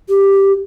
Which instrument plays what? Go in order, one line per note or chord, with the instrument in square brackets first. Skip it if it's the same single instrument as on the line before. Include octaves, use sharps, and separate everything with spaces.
[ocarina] G4